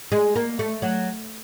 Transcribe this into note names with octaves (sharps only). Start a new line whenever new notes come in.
G#3
A#3
A3
F#3